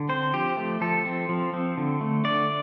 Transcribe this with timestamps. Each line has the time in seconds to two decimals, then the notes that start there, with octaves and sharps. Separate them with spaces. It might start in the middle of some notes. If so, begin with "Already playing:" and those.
Already playing: D3
0.09 C4 C5
0.33 F3 G4
0.57 A3
0.81 F3 A4
1.05 C4
1.29 F3
1.53 C4
1.77 D3
2.01 A3
2.24 D3 D5